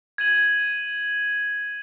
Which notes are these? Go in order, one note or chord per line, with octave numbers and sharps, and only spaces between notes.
G#6 D#7 F#7